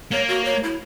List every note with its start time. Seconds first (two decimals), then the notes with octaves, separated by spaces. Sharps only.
0.12 A#3 C#5
0.28 F#4
0.45 C#5
0.63 E4